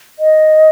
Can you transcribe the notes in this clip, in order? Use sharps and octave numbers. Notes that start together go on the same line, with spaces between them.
D#5